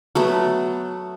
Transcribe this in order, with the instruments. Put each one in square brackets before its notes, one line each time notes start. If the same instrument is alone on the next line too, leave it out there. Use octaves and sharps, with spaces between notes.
[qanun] F#3 A3 B3